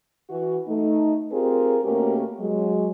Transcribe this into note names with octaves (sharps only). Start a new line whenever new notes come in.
E3 F#4
A3 D#4
C4 F4 G4 G#4 A#4
B2 A3 A#3 C#4 G4 A#4
F#3 G#3